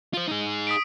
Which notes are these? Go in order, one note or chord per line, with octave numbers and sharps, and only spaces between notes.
F4 C5
D#4 G#4
D#6 B6 D7